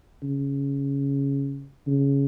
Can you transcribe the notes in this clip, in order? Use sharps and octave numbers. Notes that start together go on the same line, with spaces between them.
C#3
C#3